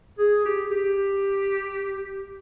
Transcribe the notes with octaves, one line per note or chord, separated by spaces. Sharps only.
G#4
G4
G4